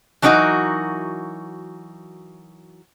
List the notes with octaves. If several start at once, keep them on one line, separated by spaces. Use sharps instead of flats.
E3 F#3 D4 D#4 F#4 A#4